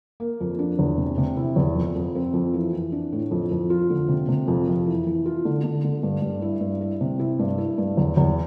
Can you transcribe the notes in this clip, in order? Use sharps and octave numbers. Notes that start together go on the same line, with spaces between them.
A#3
F2
D4
E2
C3
C3
E4
E2
F2
F2
C4
F2
E3
E3
D4
A2
F2
F2
F4
D3
C3
C3
F2
F2
E3
E3
F4
D3
D3
D3
G2
G2
E4
G2
E4
C3
E4
G2
E4
G2
E2
E2